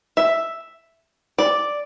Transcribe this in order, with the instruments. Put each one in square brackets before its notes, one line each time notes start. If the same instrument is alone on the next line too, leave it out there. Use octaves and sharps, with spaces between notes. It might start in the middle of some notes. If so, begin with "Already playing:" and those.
[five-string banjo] E5
D5